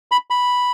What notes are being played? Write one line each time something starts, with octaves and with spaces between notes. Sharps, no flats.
B5
B5